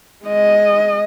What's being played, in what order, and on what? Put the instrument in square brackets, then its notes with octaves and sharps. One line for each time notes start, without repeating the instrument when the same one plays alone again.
[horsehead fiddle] G#3 D#5